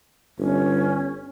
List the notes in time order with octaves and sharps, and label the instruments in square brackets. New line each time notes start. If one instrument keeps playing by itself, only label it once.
[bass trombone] G1 [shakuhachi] C#4